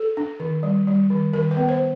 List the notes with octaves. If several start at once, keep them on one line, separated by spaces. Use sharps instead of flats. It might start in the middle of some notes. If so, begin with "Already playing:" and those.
Already playing: A4
D4
D#3
G3
G3
D#3
D#3 A#4
B4
B3
C5